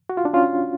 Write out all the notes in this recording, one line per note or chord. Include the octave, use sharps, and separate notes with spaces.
F#4
F4
D4
C#4 F4